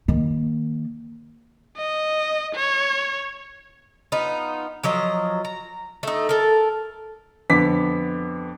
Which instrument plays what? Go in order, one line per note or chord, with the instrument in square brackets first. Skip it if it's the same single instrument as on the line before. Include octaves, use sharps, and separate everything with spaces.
[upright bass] D#3 A#3
[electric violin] D#5
C#5
[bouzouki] B3 D#4 F4
F3 F#3 D#5 A#5
A#5
A3 D#4
A4 A#4
[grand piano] F2 D3 B3 D6 B6